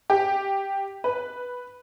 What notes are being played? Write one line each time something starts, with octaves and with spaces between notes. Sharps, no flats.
G4
B4